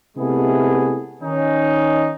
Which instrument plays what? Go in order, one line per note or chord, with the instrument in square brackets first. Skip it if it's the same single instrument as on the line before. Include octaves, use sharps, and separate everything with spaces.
[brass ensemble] C3 G#3 A3 B3 E4 G#4
D#3 C#4 D#4